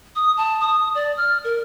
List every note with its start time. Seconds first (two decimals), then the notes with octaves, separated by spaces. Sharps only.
0.16 D#6
0.37 A5
0.61 D#6
0.95 D5
1.18 F6
1.44 A#4